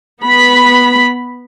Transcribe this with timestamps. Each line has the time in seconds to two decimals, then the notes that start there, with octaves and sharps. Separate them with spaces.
0.21 B3 B5